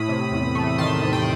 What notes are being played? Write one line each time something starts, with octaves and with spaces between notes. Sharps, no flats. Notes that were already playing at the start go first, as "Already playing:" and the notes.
Already playing: A2 B5 D#6
C3
E2
A3
D#3 A5 C6
C3
G5 B5